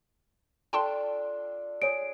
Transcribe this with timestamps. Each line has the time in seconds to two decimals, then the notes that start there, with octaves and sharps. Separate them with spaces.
0.73 D4 F4 A4 G5 A5 C6
1.82 G#4 C#5 D7